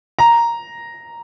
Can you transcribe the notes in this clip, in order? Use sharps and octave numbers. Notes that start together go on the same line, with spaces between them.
A#5